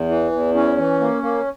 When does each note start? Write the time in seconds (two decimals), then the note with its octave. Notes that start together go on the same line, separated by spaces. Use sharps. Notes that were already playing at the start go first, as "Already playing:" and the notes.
Already playing: E2
0.09 E3
0.32 E2
0.54 E3 C#4
0.77 E3
1.00 A#3
1.23 A#3